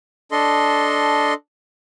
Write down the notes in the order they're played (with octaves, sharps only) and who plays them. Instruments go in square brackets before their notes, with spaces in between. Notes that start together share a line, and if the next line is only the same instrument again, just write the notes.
[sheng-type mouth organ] D4 A4 D#5 C6